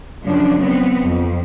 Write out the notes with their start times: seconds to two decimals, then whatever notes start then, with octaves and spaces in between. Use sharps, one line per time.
0.25 F#2 C#3 F3 D4
0.60 B3 C4
0.98 F2